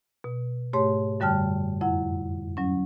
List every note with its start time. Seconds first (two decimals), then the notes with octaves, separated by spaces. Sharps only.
0.24 B2
0.73 G#2 A3 G4 C#5 C6
1.20 F#2 D3 G3 G5 A5 F6
1.81 F2 E4 F#5
2.57 F#3 C#4